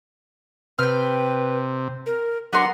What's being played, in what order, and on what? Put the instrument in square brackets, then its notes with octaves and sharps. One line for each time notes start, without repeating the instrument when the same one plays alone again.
[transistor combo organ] C3 [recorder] B4 [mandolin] G5 F6
[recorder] A#4
[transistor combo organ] F#3 D4 [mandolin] B3 A#4 C6 [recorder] F#5